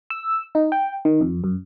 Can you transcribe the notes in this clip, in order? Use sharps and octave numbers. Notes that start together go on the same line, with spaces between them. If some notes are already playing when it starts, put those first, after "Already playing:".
E6
D#4
G5
D#3
F2
F#2